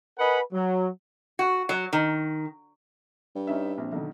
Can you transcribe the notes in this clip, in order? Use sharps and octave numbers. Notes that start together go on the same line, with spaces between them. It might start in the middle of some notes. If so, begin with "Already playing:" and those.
A#4 B4 D#5 F#5 G#5 B5
F#3
F#4
F#3
D#3
G2
C#4 D#4 E5
A#1 C4
B1 D3 D#3